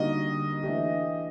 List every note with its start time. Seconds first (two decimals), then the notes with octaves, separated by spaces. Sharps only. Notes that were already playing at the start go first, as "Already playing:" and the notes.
Already playing: D3 G3 A#3 D#4 F#4 D#5
0.63 E3 A3 D4 G4